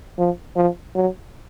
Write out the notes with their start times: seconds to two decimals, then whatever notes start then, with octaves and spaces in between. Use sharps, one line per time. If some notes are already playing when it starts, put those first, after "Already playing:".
0.18 F3
0.56 F3
0.95 F#3